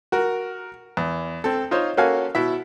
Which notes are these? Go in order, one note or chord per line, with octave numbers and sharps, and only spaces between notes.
F#4 A#4
E2
C4 A4
D#4 F4 C5 C#5
A#3 C#4 F#4 A4 F5 G#5
B2 E4 E5